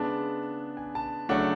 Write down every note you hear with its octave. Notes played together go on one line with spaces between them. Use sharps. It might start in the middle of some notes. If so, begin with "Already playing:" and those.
Already playing: C#3 G#3 B3 D4 A5
G#5
A5
C#3 F#3 A3 D4 F#5